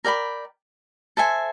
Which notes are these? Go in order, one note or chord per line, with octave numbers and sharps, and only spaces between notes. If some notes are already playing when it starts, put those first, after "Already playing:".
A#4 D5 G5 B5
A4 C5 E5 G#5